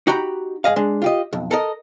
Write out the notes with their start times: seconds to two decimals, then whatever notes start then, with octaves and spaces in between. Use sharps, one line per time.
0.07 D#4 F#4 G4 A#5 B5
0.64 G#2 G#4 D#5 F5
0.76 G#3 D4
1.02 F4 G4 D#5
1.33 B1 F2
1.51 A4 A#4 D#5